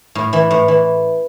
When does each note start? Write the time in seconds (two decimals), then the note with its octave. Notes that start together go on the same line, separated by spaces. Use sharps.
0.15 A2
0.33 E3
0.51 A2
0.68 E3